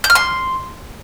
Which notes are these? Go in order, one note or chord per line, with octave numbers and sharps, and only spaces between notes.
G6
F6
C6